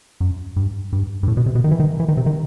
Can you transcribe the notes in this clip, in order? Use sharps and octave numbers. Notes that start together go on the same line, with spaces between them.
F#2
G2
G2
G2
A2
B2
C3
B2
D#3
E3
D#3
E3
D#3
C3
D#3